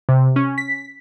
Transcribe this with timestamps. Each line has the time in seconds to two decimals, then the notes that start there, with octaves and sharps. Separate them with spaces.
0.09 C3
0.36 C#4
0.58 B6